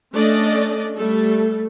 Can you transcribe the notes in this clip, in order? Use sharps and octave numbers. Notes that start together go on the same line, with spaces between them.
A3 C#4 D4 A4 D5 D#5
G3 A3 A4